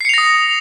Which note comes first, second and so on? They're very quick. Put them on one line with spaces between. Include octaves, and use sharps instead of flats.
C7 C#7 F7 A#6 D#6